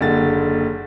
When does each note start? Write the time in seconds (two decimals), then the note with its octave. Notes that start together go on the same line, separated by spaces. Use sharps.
0.01 F#1 D#2 D3 A6